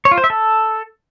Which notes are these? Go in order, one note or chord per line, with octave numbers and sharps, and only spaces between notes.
C#5
F4
C5
E5
A4